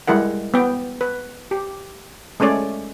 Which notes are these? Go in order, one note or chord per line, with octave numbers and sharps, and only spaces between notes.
G3 G#3 E4 A#4 F#5
B3 G5
B4
G4
G#3 A3 C#4 C#5 D5